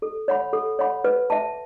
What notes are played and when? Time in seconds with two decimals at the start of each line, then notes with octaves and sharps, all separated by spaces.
0.02 A4
0.28 C#5 F#5 B5
0.53 A4
0.79 C#5 F#5 B5
1.04 B4
1.30 E5 A5